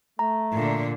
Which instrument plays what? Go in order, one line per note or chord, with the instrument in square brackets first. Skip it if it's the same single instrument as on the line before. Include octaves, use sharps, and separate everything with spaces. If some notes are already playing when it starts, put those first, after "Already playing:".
[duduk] A3 [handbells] A#5
[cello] A#2 D3